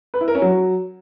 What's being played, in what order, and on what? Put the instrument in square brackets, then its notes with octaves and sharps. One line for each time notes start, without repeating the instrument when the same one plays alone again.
[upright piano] B4
E4
A#4
C#4
F#3